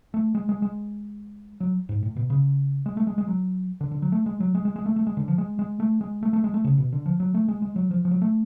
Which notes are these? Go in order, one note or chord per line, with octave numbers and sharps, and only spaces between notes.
A3
G#3
G#3
G#3
F#3
G#2
A2
B2
C#3
G#3
A3
G#3
G#3
F#3
D3
D3
F#3
A3
G#3
F#3
G#3
G#3
G#3
A3
A3
G#3
D3
F3
G#3
G#3
A3
G#3
A3
A3
G#3
A3
C#3
B2
D3
F3
F#3
A3
G#3
G#3
F#3
F3
F3
F#3
A3